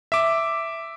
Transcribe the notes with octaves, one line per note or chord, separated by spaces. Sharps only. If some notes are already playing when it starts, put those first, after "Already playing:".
E5 D6